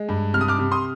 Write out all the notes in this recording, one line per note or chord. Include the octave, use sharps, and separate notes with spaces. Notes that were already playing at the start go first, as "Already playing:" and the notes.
Already playing: G#3
G2
C3 F6
D#6
D6 F6
C3
C6 D#6